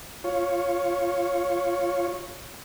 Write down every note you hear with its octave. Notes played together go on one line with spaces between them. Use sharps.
F4 C#5